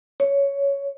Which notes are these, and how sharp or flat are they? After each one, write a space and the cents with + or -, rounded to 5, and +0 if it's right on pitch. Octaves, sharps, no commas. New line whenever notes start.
C#5 +10